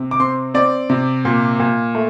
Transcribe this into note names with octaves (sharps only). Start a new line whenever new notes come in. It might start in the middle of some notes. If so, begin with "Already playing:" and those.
Already playing: C3
D6
C4 C6
C4 D5
C3
A#2
A#2
A3